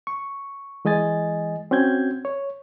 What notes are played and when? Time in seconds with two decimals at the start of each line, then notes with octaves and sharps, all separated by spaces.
0.07 C#6
0.85 E3 G#3 D#5 G#5 A6
1.71 C4 C#4 F#4 G6 G#6
2.25 C#5